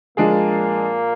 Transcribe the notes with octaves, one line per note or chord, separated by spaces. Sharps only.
A#2 F3 G#3 A#3 D4 G#4